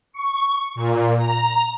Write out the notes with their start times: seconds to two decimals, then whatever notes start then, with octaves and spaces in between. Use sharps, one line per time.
0.13 C#6
0.75 A#2
1.18 A#5